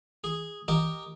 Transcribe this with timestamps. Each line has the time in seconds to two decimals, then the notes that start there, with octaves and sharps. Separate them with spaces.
0.24 G#4
0.68 G4 A#4 D#5 G5